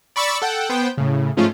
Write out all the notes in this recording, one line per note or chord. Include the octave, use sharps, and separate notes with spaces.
D5 B5 C#6 E6 A6
A4 F#5 G5
B3 C5 G5
A2 C#3
G#2 F3 A3 C#4 F4